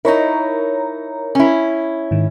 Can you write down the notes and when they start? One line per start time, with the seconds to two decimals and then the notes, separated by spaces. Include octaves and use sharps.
0.05 D#4 E4 A#4 C#5 A#5
1.35 C#4 E4
2.11 G#2 D#3